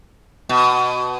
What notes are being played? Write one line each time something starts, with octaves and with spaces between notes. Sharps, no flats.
B2